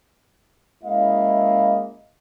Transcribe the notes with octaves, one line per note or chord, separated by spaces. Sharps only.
G#3 A#3 C#4 E4 D#5 F5